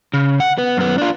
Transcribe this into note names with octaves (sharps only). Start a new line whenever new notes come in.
C#3
F#5
B3
F#2 B3
D4 F4